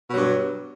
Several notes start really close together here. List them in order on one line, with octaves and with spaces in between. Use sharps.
B2 F#3 G2